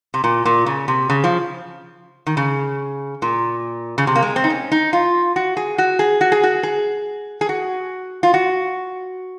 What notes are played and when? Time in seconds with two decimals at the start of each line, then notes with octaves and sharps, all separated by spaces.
0.14 C3
0.24 A#2
0.45 A#2
0.66 C#3
0.88 C3
1.09 C#3
1.24 F3
2.27 D#3
2.37 C#3
3.22 A#2
3.98 C#3
4.07 C3
4.15 A#3
4.22 G#3
4.36 C4
4.44 D#4
4.50 C#4
4.71 D#4
4.93 F4
5.36 F#4
5.57 G#4
5.78 F#4
5.99 G#4
6.21 F#4
6.32 G#4
6.43 F#4
6.63 G#4
7.41 G#4
7.49 F#4
8.23 F4
8.34 F#4